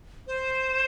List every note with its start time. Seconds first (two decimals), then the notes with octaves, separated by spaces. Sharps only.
0.27 C5